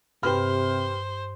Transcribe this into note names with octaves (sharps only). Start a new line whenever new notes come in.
G2 C3 G4 B4 C5 F6